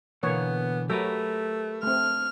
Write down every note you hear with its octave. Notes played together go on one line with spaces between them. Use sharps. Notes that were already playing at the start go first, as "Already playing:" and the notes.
B2 D3 E3 A#3 B3 C#5
F#3 A3 G4 A#4 B4
A3 C4 F6